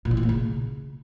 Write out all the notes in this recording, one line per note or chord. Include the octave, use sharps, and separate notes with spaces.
A#2
E3
A#2
A#3
C#3